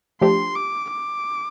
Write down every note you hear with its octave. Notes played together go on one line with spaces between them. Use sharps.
F3 A3 D4 G4 C6
D6
D6